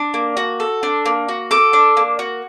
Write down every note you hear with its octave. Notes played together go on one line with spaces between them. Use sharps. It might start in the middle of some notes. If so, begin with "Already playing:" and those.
Already playing: D4
A#3
F#4
A4
D4
A#3
F#4
A4 D6
D4
A#3
F#4